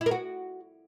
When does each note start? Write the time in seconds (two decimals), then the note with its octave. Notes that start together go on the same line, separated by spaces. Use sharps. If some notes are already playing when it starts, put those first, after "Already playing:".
0.01 E4
0.06 A#4
0.11 F#4